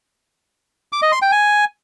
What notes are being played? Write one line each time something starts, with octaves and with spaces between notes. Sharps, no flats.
D6
D#5
C6
G5
G#5